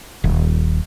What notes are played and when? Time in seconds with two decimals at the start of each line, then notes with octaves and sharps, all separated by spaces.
0.24 D#1